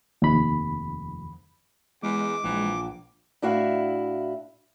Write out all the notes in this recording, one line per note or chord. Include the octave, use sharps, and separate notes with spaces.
F1 D#2 B5
E2 G#3 D6
A#1 E3
A2 D4 E4 F#4 E5 F5